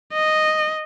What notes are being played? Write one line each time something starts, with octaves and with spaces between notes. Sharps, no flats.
D#5